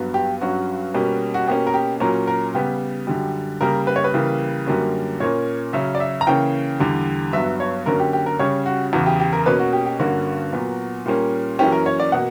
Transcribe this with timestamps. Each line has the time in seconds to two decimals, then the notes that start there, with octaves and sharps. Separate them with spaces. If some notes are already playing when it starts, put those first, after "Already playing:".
Already playing: G2 F#3 B3
0.14 G4
0.41 G2 F#3 C#4 F#4
0.94 B2 G3 A#3 C#4
1.34 F#4
1.47 B2 A#3 C#4 G4
1.67 A#4
1.74 G4
2.00 A#2 F#3 A#3 C#4 A#4
2.27 A#4
2.54 C#3 G3 B3 G4
3.07 F#2 D3 G3
3.61 C#3 G3 A#3 A#4
3.87 B4
3.96 C#5
4.04 B4
4.14 C#3 E3 G3 A#3
4.67 F#2 D3 G3 A#3 C#4
5.20 A#2 A#3 C#4 C#5
5.73 C#3 F#3 C#4 E5
5.95 D5
6.00 E5
6.21 A#5
6.27 C#3 E3 A#3 C#4 G5
6.80 E2 D3 G3
7.33 G2 F#3 B3 E5
7.60 C#5
7.86 F#2 D3 A#3 C#4 A#4
8.00 G4
8.13 G4
8.26 A#4
8.39 C#3 G3 C#4 C#5
8.66 F#4
8.93 E2 C#3 E3 F#4
9.06 G4
9.20 G4
9.33 A#4
9.46 B2 A#3 C#4 B4
9.59 F#4
9.73 G4
9.86 G4
9.99 G2 D3 A#3 C#4 F#4
10.53 A#2 F#3 B3
11.06 A#2 G3 A#3 C#4
11.59 F#2 E3 A#3 C#4 G4
11.72 A#4
11.86 C#5
12.00 D5
12.12 B2 A#3 F#5